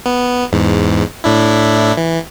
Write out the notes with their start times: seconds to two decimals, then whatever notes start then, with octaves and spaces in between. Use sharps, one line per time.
0.06 B3
0.53 E2 G#2
1.24 A2 D4 E4
1.97 E3